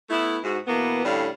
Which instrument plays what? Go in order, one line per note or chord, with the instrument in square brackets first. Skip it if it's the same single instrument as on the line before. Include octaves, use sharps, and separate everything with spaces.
[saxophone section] A3 B3 E4
G#2 F#4
B2 E3 A#3 B3
A2 D3 G3 C#4 F5